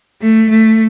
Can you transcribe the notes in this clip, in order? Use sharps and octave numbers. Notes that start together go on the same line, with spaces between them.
A3
A3